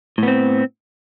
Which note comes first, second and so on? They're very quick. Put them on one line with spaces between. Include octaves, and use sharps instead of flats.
A2 B3 C4